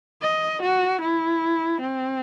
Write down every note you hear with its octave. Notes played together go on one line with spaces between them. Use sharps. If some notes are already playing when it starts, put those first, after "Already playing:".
D#5
F#4
E4
C4